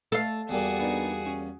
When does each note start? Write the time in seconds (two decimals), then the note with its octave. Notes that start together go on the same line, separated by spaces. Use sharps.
0.12 A3 A4 F5 A5
0.49 E2 G3 A#3 F#4 G#4
0.79 B3 D4 D#4
1.26 C#4